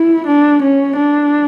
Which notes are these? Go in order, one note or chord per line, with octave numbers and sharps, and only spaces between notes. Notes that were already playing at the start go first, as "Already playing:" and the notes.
Already playing: E4
D4
C#4
D4